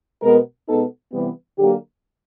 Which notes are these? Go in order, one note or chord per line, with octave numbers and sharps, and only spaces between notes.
B2 G#3 B3 A#4
B2 G#3 B3 D#4 A4
C3 E3 G3 B3
D3 F#3 A#3 G4